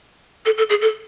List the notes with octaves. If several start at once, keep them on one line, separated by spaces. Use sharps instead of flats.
A4
A4
G#4
A4